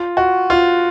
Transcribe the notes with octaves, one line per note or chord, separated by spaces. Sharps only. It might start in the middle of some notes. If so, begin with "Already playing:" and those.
Already playing: F4
F#4
F4